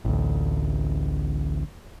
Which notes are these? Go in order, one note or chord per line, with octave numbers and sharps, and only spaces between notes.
A1 D2